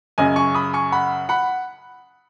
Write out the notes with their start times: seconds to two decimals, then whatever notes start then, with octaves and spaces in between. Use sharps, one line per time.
0.18 F#2 C#3 D#5 G#5
0.36 G#5 C#6
0.55 B5 D#6
0.73 G#5 C#6
0.92 F#5 B5
1.29 F#5 B5